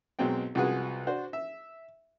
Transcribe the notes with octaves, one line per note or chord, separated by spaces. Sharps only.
B1 F#3 G#3 C4 G5
C2 F3 G#3 F#4 G#4 B4
D4 F#4 C5
E5